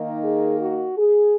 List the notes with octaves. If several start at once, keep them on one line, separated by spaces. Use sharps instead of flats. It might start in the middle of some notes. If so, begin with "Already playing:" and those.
Already playing: D#3 A#3 D#4
G#4
F#4
G#4